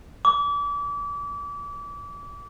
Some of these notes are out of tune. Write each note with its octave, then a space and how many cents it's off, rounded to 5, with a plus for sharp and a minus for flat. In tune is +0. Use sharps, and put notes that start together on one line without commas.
D6 -35